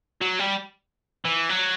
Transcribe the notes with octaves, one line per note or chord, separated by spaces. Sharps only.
F#3
G3
E3
F#3